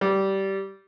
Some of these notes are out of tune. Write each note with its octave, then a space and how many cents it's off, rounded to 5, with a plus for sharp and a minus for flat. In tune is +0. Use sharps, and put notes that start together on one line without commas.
G3 -15